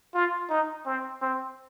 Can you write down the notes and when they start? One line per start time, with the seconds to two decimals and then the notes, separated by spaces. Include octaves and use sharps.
0.14 F4
0.50 D#4
0.86 C4
1.22 C4